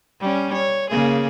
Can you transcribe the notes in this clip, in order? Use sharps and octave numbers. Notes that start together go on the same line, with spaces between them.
G3 C#4
C#5
C#3 A#3 G#4